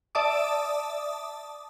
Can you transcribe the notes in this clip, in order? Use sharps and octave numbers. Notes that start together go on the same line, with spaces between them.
D5 E5 A5 D6 D#6